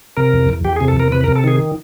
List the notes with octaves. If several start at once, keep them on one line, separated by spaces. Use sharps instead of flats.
C3 A#4
E2
E2
E2 G4
G#4
C3
A4
E2 A#4
C3 B4
A#4
C3
A4
D#3 G#4